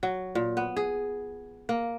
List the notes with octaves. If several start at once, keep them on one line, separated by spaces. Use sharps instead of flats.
F#3
A#2
B3
G#4
A#3